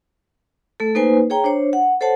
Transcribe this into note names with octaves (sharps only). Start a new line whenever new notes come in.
A3 A4
A#3 D#4 B4 C5 G#5
G#4 C#5 G5 A#5
D4 C5 C#5
F#5
A4 C5 C#5 F#5 A5